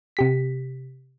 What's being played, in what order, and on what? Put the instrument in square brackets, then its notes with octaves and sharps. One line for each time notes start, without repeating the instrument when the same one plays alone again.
[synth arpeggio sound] C3 G4 B6